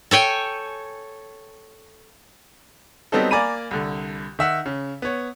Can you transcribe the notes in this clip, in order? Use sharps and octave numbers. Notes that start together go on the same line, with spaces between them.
A4 C#5 G5 G#5
F#3 G3 B3 C4 D#4 A4
A#3 D5 G#5 A#5 B5 D#7
C2 D3
D#3 E5 F#5
C#3
B3 C#5